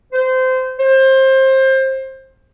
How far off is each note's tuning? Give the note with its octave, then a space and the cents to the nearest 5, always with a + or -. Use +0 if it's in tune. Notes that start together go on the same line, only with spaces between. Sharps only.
C5 -20
C5 +25